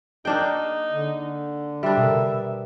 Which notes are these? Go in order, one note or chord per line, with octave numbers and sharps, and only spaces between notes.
A#3 D4 D#4 G#4 G5 C7 E7
D3
G3 D4 E5
B2 A#4